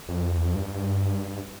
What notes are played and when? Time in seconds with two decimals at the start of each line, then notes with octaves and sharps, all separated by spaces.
0.09 F2
0.37 E2
0.46 F2
0.55 G2